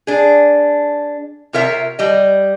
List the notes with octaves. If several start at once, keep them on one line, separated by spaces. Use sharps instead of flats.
D4 G#4
C3 F4 A#4 C#5 E5
G3 D#5